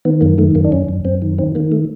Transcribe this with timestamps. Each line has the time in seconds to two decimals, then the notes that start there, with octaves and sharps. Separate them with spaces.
0.05 D#3 B3
0.21 F#2 A#3
0.38 D#3 A3
0.55 F#2 A#3
0.65 D4
0.72 F#2 C#4
0.88 F#2
1.05 F#2 C4
1.22 D#3
1.38 D#3 C4
1.55 D#3 A#3
1.72 A3